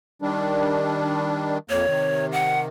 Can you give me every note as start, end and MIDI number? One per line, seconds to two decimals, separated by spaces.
0.22 1.58 51
0.22 1.58 55
0.22 1.58 62
1.70 1.86 41
1.70 1.86 58
1.70 2.26 73
1.87 2.68 48
1.87 2.68 51
2.32 2.59 78